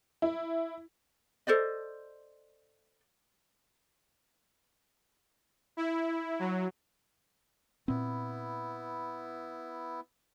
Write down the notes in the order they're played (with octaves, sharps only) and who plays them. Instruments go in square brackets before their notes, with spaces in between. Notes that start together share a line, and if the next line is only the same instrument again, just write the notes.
[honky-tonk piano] E4
[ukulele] A4 C5 D5 D#5
[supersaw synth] E4
F#3
[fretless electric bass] A#2 C4 [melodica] B3 E4